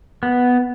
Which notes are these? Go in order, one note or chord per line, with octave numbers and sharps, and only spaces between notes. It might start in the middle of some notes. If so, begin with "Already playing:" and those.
B3